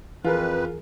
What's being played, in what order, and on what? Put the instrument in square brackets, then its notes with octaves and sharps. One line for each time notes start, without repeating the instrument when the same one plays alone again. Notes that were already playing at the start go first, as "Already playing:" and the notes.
[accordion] F2 B4 [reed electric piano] E3 G#4 A#4 [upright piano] F4